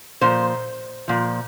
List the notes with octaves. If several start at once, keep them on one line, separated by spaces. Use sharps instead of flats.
A#2 F3 C5
A#2 F3